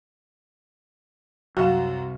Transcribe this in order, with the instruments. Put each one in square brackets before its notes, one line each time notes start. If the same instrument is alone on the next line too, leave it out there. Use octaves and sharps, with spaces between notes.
[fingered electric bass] C2 [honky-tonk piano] F#2 F#5 E7 [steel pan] F#4 [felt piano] F5